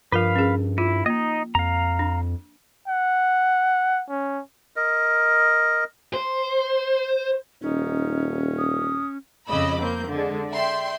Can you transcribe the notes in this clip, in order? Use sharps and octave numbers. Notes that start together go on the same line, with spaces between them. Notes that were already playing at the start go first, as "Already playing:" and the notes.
G2 F3 F4 A#4 B4 F5
C#4 G#4
E4 F4
A#3 D#4 D#5
F2 F5 A#5
D4
F#5
C#4
A#4 D#5
C5
D#1 C#4 D#4
D#6
F2 C#3 D#5 B5 D6 E6
A#3 C4 G6
D3 G#3
D5 E5 G5 C6